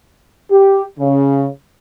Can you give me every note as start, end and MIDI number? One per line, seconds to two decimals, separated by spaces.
0.51 0.82 67
0.99 1.48 49